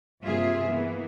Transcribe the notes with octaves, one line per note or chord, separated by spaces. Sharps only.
G2 C3 A#3 F4 G#4 E5
E3 A#3 B3